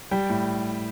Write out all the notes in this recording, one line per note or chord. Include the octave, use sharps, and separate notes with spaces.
G3 G5
A2